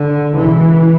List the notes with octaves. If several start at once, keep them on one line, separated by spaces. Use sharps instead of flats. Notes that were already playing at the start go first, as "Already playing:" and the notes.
Already playing: D3
C#2 B2 E3